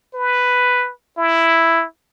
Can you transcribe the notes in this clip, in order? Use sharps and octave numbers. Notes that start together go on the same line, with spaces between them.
B4
E4